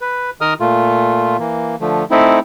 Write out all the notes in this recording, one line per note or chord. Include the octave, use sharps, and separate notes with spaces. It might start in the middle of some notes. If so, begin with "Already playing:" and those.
B4
D#3 A#4 D#5 D#6 F6
A#2 A3 F4
E3 A#3
D3 F3 A3
A3 C4 D#4 E4